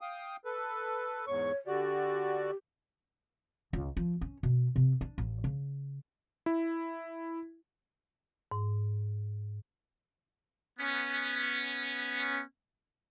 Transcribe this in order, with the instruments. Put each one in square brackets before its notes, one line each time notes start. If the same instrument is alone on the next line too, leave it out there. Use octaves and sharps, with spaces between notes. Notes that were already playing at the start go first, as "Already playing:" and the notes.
[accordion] F5 G5 D#6
A4 B4
[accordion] E2 G#2 C#6 [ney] C#5
[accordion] D3 F#4 D5 [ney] G4
[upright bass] C#2
F3
C#4
B2
C3
D4
A1
C#3
[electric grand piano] E4
[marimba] G#2
[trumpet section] B3 C#4